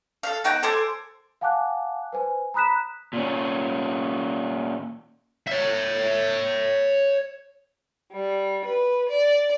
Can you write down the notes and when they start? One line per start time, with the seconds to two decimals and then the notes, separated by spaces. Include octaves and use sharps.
0.23 A4 F5
0.44 B3 D#4 F#5 G5
0.63 A4 C5 G#5 D6
1.41 F5 F#5 G#5 A5 D6 F#6
2.13 B4 C5 G#5
2.54 A#5 B5 D#6 F#6 B6 E7
3.13 A#2 C#4
5.48 C#5 E5
8.13 G3
8.65 B4
9.07 D5